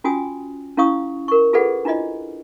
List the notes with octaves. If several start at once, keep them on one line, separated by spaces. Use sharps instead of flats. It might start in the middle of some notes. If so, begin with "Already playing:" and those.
C#4 F4 F#4 G5 G#5 D#6
C#4 E4 F5 C#6 D#6
A#4 C#6
F4 G#4 A4 B4 D5 F#5
D4 E4 F4 D5 D#5